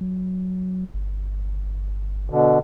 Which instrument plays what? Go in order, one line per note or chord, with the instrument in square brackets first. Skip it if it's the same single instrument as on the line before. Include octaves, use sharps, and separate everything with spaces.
[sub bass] F#3
G1
[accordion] B2 D3